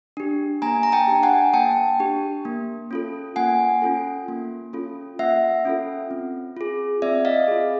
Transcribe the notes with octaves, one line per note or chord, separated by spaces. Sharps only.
D4 G4
A#3 G#5 A#5
A#5
G5 A5
D4 G4
F#5 G#5
A#3 G5 A5
D4 G4
A#3
C#4 F4 A4
A#3 F#5 G#5
C#4 F4 A4
A#3
C#4 F4 A4
A#3 E5 F#5
C#4 F4 A4
C4
F4 G#4
C4 D5 E5
D#5 F5
F4 G#4